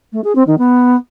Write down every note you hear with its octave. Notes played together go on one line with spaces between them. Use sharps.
A3
G#4
C4
D#3
B3